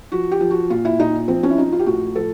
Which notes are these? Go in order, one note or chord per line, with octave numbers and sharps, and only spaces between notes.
F3 F#4
G4
F3
F#4
A#2 F4
E4
A#2 D#4
F3 C4
C#4
E4
F3 D#4
F4
G4
A2 F#4
F3 A4